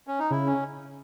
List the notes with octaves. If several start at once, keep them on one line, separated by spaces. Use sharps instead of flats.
C#4
D#4
C#3 E4
C#4